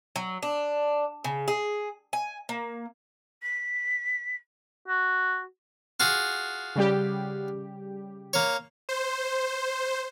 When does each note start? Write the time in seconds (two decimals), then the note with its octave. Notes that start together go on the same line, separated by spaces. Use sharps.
0.16 F#3
0.43 D4
1.24 C#3
1.48 G#4
2.13 G#5
2.49 A#3
3.42 B6
4.88 F#4
6.00 F4 F#4 G#4
6.75 C#3 G3 G4
8.33 A#3 C#5
8.89 C5